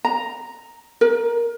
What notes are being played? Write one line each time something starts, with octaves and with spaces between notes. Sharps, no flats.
A#5
A#4